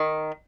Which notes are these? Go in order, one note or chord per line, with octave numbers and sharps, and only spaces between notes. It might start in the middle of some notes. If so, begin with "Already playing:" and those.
Already playing: D#3